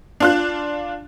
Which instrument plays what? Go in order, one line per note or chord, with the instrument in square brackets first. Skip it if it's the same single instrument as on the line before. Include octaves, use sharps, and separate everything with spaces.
[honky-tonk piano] D4 F4 F#6